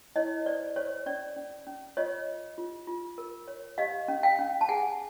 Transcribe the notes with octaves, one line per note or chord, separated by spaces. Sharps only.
E4 C#5 D#5
C5 D5
C5 C#5
C#4 D5
C#4
C#4
F4 C#5 D#5
C#5
F4
F4
A#4
C#5
G4 D#5 F5
C#4
F5 G5
C#4
A5
G#4 F#5 G#5